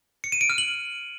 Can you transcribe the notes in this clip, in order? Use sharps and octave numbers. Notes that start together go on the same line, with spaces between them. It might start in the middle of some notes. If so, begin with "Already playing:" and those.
C#7
D#7
D7
F6
F#7